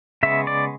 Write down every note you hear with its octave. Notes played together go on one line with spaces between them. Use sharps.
C#3 G#3 B3 E5
D5